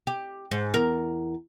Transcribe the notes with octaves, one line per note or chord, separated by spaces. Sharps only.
G4
G#2
E2 A#4